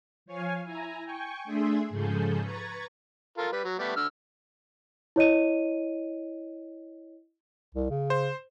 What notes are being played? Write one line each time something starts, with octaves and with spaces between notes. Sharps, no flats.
F3 C#5 F5 G#5
E4 G#5 A#5
G5 G#5 C#6
A3 D4 G#4 E5 G#5 C6
G#2 C#3 F3 G#4 A4 G6
B4 A#5 C#6 G#6 A6
F4 A4 A#4
G3 B4
F#3
G3 A3 B3
D3 E6 F6
E4 C#5 D#5 D#7
C2
C#3
C5